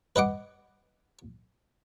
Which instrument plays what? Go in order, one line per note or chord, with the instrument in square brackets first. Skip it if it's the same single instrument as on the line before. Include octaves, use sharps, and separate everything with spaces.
[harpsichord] B4 D#5 F#5 D6